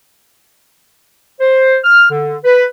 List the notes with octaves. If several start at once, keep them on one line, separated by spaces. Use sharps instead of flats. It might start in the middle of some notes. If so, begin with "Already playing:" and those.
C5
F6
D3
B4